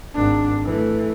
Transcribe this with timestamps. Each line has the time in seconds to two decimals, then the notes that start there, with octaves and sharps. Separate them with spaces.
0.15 G#1 D4
0.65 E3 A3